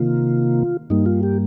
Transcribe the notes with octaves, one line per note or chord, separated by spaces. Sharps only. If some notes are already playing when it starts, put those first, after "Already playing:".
Already playing: C3 D#3 A#3 F4
G2 G3 A#3 D#4
F4
G4